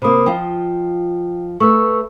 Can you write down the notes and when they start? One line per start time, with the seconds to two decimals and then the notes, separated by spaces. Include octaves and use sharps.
0.02 C3 A#3 C5 B5 D#6
0.26 F3 F4 D#5 G5
1.60 A3 B4 C#6 E6